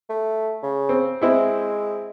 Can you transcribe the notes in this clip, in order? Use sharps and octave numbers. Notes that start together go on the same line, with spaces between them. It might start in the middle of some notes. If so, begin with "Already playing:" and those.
A3
C#3
C4
G#3 C4 E4 E5